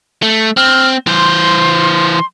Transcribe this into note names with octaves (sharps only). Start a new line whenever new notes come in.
A3
C4 F6
E3 C5 C6